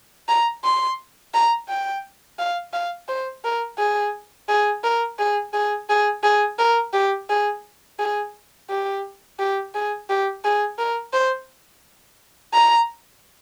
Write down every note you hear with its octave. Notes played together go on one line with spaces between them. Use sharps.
A#5
C6
A#5
G5
F5
F5
C5
A#4
G#4
G#4
A#4
G#4
G#4
G#4
G#4
A#4
G4
G#4
G#4
G4
G4
G#4
G4
G#4
A#4
C5
A#5